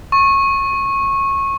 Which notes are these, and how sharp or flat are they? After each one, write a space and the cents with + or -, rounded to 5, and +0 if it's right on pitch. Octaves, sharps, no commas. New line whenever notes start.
C#6 -20